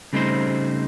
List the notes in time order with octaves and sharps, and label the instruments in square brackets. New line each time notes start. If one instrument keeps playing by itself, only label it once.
[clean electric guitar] C#3 G3 A3 C4 D#4 C5